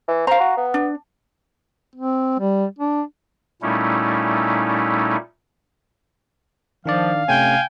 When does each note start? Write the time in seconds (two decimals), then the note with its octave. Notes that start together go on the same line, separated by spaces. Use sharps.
0.08 E3
0.27 C5 F5 A#5
0.40 F#4
0.57 B3
0.74 D4
1.96 C4
2.39 G3
2.79 D4
3.62 A#2 G3 A3 C#4 D#4 E4
6.86 D#3 F3 D4 D5 F5
7.28 C3 A3 C#4 G5 G#5